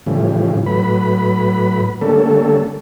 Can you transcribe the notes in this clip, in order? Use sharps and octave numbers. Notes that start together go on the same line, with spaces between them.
A2 C#3 E3 F3 G3
A2 F#3 B4 B5
D3 G3 A3 A#3 C#4 A4